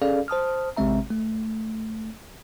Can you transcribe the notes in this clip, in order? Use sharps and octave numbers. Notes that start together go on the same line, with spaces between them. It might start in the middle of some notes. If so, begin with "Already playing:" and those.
C#4 G#4 A4 D5 F5
C5 A5 D#6 F6
A1 C3 G#3 C4 E5 A#5
A3